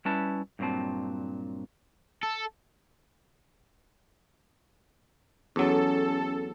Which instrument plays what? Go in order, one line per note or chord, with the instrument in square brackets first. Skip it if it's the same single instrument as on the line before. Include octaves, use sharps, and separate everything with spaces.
[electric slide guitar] G3 C#4 E4 B4 A5
G2 A#2 F#3 C4 A5
[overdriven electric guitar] A4
[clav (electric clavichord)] E2 F#3 [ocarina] C#4 [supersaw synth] A4